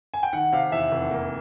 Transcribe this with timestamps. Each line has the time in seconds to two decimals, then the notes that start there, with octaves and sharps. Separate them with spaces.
0.14 G#5
0.23 G5
0.33 D#3 F#5
0.52 C3 F5
0.72 E2 E5
0.92 F1
1.11 A#3